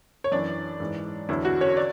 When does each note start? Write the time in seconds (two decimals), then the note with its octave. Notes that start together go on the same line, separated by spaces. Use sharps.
0.24 C#5
0.32 F#2 E3 D4 D5
0.80 G#2 E3
1.29 E2 D3 F#3 E4
1.45 F#4
1.61 C#4 C#5
1.77 D5